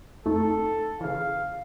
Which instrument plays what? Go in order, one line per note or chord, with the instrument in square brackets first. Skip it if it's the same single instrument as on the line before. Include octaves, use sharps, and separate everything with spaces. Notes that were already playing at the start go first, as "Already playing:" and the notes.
[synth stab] F2 A3 D#4 [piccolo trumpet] A4
[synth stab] C#3 E3 [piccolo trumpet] F5